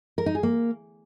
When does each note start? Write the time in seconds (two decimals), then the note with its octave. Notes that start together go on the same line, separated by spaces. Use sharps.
0.18 A#4
0.26 D#4
0.35 G#4
0.43 A#3